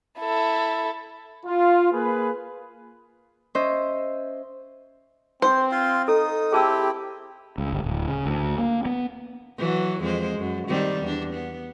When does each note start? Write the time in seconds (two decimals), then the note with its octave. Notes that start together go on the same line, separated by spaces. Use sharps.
0.20 E4 A4
1.46 F4
1.92 A#3 G#4 B4
3.55 C#4 C5 D#5 E5
5.42 C4 C5
5.72 F4 F5 C6
6.08 D#4 A4 D#6
6.53 C4 E4 G4 G#4 A5 E6
7.58 C#2
7.73 G1
7.84 D1
8.08 C#3
8.26 D2
8.58 A#3
8.86 B3
9.58 E3 F#3
10.01 F2 G#3 C5
10.39 F#2
10.68 D#3 G3 C4
11.02 E2 D4
11.33 B3